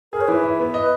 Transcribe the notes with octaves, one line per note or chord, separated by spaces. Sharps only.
G#4 A#4
C#5
E3 B4
E4
B3
D#5